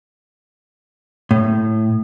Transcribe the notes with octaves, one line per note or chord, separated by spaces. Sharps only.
A2